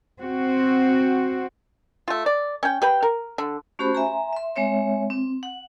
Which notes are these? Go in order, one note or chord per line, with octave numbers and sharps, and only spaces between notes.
C4 F#4
A3 F4
D5
C#4 G5
G4 B4 G5
A#4
D3
A3 C#4 F#4 G4 C5 B5
E5 G#5 A#5 C6
E5 C6
G#3 C4 C#5 E5
C4
F#5